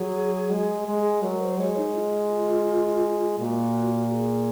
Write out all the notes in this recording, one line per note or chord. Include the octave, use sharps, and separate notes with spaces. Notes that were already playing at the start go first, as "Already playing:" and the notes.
Already playing: F#3 G#4
G#3
G#3
F#3 A#4
C5
G#3 C#5
D#4
F4
A#2 F#4
G#4